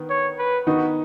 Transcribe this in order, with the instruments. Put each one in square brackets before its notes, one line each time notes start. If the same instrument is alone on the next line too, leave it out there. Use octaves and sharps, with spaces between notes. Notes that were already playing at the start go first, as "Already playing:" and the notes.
Already playing: [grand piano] D#3 B3
[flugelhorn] C#5
B4
[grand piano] D#3 B3 D#4 [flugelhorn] F#4